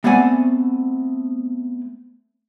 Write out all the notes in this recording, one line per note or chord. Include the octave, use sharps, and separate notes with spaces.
A3 B3 C4 D5 F#5 G#5